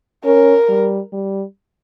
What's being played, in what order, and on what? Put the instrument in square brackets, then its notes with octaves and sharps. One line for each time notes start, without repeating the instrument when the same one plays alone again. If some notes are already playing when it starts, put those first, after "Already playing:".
[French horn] C#4 [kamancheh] A#4
[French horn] G3
G3